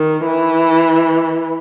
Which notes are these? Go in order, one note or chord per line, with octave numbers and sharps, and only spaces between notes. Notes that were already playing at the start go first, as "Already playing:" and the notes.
Already playing: D#3
E3